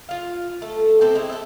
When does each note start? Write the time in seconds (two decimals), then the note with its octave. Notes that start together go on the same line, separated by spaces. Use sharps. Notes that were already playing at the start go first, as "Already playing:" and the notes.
0.09 F4 F5
0.62 A3 A4
1.01 C3 C4 A4 C5
1.15 G#3 C4 E4
1.29 A4 E5